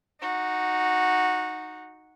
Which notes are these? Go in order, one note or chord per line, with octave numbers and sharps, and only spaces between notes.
D#4 F#4